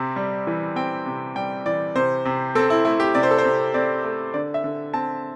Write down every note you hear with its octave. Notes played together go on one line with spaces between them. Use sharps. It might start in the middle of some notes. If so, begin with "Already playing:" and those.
Already playing: C3 C4
G3
E3
C4 G5
C3
G3 G5
E3 D5
C3 C5
C3
C4 A4
E4
A3 E4
G4
C3 D5
C5
A4
C5
C3
C4 D5
A3
D3 D5
E5
D3
C4 A5